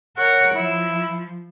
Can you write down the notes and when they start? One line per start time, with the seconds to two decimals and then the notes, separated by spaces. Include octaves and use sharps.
0.17 A#4 C#5 F#5
0.55 F3 E4